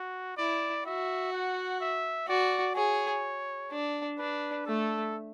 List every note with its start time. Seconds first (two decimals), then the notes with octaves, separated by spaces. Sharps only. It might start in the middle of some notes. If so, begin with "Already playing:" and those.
Already playing: F#4
0.37 E4 D5
0.86 F#4 E5
1.33 F#5
1.80 E5
2.27 F#4 D5
2.75 G#4 C#5
3.71 D4
4.18 D4 B4
4.66 A3 A4